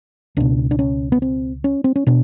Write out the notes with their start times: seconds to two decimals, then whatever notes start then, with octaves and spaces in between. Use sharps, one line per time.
0.37 C#2 B2 D4
0.71 D4
0.79 C#4
1.12 B3
1.22 C4
1.64 C#4
1.84 C4
1.96 C#4
2.07 B2 D4